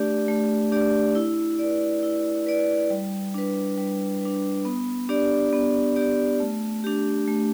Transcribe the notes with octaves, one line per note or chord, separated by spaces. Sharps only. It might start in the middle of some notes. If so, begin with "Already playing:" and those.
Already playing: A3 D4 G4 D5
A3
D4 G4 D5
E4
B4 D5
E4
B4 D5
G3
D4 B4
G3
D4 B4
B3
D4 G4 D5
B3
D4 G4 D5
A3
D4 G4
A3